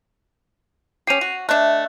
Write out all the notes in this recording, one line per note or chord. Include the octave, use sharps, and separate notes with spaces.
C#4 G4 C7 D#7 F7
F#4
A3 D4 D#5 E5 F#6